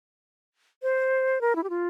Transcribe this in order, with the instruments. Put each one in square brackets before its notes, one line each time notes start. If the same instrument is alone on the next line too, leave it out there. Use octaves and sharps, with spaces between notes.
[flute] C5
A#4
E4
G4
F4